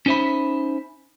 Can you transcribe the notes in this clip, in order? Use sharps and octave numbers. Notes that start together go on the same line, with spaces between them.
C#4 D#4 C5 E5 B5